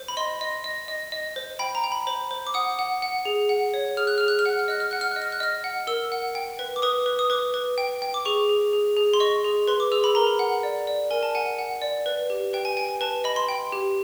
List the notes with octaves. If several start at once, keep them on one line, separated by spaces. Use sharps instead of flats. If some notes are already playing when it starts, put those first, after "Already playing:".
Already playing: C5
B5
D#5 C6
D#5
D#5
D#5
D#5
C5
G5 B5
A#5
G5
B5
C5 B5
C5
D6
F#5 D#6
F#5
F#5
G#4
F#5
C#5
G#4 F6
F#6
G#4 F6
F#6
F6
F#5 F#6
F6
D#5 F#6
F6
F#5 F#6
F6
D#5 F#6
F6
F#6
D#5 F6
F#5
A#4 E6
F#5
G5
B4
D6
B4 D#6
B4
D#6
B4 D6
B4
G5
G5
D6
G#4 C#6
G#4
G#4
G#4
C6
D#5 C#6
G#4
B4 C6
D6
G#4 E6
B5
A#4 A#5
B5
F#5
D5
D5
A#4 G#5
A5
F#5 G#5
F#5
D5
B4
G4
B4 G5
G#5
G5 G#5
G#5
B4 A5
D#5 B5
C6
G5
G4